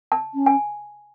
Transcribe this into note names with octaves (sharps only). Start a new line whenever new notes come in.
A5
C#4
G#5